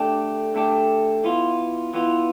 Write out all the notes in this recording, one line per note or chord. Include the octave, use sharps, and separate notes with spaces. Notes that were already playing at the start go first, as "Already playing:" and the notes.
Already playing: D3 A3 D4 G4
D3 A3 D4 G4
E3 B3 F4
E3 B3 F4